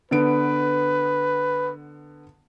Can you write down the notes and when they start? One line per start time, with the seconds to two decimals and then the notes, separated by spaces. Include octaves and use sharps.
0.11 D3 B3 B4 D7